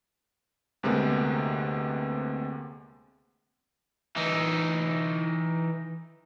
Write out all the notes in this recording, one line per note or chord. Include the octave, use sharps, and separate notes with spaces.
D2 C3 G#3 A#3 B3
E3 D#4